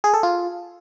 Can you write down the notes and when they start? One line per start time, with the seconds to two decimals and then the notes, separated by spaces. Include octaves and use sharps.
0.04 G#4
0.14 A4
0.23 F4